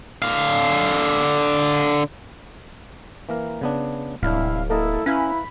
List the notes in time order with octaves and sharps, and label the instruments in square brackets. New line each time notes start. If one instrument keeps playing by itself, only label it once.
[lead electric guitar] D3 F5
[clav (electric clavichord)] E3 A#3 A#4
C#3 B3 D4
[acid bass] D1 [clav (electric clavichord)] C2 D4 [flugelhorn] E4 [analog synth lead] F5
[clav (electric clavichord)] A#3 A#4 D#5 [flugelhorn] E4 [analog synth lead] A4
[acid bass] C#4 [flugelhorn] E4 [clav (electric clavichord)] B4 F5 A#5 [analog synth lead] B5